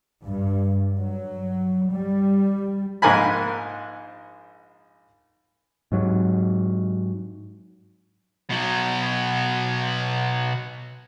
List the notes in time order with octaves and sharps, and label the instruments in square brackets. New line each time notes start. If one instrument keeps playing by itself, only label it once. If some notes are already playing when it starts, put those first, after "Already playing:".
[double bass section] G2
F#3
G3
[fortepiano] A#1 G#2 A#4 G#5 B5
[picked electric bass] G#2 F#3
[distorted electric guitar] B2 F#3